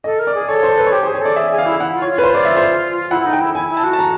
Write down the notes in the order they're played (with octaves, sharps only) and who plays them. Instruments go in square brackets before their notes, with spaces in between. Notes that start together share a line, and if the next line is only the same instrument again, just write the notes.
[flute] A4 [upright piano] D#5
[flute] A#4
[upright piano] D5
[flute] G#4
[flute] A4 [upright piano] C#5
[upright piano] C5
B4
C#5
[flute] G4 [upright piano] C5
[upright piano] C5
[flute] G#4
[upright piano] C#5
[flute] A4 [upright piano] D5
[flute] G#4 [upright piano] E5
[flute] G#4
[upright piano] F5
[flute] E4
[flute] E4 [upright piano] F#5
[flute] F4
[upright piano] C#5
[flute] F4
[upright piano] B4
C5
D5
E5
C5
[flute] E4 [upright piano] F#5
[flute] D#4
[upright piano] G5
[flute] E4
[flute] E4 [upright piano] G#5
[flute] E4
[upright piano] A5
[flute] F#4
[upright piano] A5
A#5